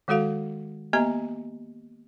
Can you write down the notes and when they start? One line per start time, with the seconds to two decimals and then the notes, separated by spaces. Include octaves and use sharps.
0.08 D#3 G#3 F#4 A4 F5 F#5
0.93 A#3 B3 G4 D#5 E5 A#5